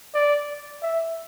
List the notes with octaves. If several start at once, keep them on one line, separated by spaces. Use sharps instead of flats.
D5
E5